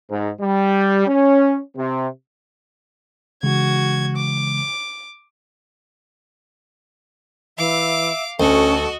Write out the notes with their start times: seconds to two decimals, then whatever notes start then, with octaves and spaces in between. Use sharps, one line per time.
0.10 G#2
0.41 G3
1.08 C#4
1.77 C3
3.43 C#3 E3 G#3 F#4 G#6
4.16 D6
7.58 E3 E5 F5 D6
8.40 D2 C#4 F#4 A4 D#5 C#6